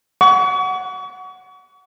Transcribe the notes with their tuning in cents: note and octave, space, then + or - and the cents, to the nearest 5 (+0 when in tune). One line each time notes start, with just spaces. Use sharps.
F#5 +0 C#6 +40